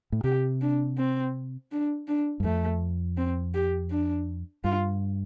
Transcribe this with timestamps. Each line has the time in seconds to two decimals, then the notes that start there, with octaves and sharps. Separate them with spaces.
0.12 A2
0.24 C3 G4
0.61 D4
0.98 C4
1.72 D4
2.08 D4
2.40 G2
2.44 F2 A3
3.18 C4
3.54 G4
3.91 D4
4.64 G2 F4